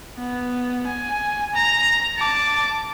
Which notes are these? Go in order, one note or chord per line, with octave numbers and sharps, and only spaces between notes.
B3
G#5
A#5
A5 D6